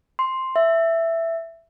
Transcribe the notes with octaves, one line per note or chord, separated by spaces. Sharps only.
C6
E5